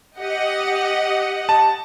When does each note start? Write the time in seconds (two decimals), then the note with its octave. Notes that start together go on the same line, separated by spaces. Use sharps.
0.19 G4 D#5 F#5
1.49 A5